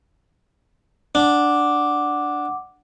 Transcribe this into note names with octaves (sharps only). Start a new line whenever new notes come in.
D4 F#5 D6